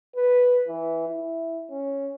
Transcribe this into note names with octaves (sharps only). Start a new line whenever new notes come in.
B4
E3
E4
C#4